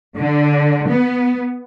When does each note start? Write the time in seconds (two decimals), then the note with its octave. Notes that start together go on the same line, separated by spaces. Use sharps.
0.18 D3
0.88 B3